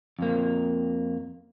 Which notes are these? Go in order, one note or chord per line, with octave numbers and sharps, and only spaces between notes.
F2 A#3